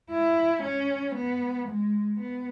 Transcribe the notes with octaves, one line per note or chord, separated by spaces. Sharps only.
E4
C#4
B3
G#3
B3